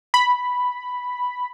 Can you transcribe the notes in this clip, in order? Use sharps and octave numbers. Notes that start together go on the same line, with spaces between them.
B5